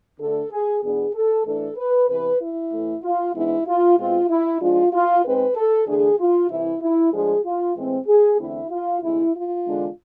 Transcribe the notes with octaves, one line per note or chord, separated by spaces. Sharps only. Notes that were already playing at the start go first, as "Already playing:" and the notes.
D2 D3 A3 D4 A4
G#4
E2 B2 B3 D4 G#4
A4
A2 E3 A3 D4 A4
B4
E2 C3 E3 B4
E4
A2 E3 A3
F4
G#2 E3 G#3 B3 D4 E4
F4
B2 G#3 C4 F4
E4
G#2 F3 G#3 D4 F4
F4
G#2 G#3 C4 B4
A4
E2 D3 A3 D4 G#4
F4
C2 C3 E3 E4
E4
A2 F3 G#3 D4 G#4
F4
A2 E3 G#3 C4
G#4
E2 D3 A3 C4 E4
F4
D2 C3 G#3 E4
F4
E2 D3 G#3 D4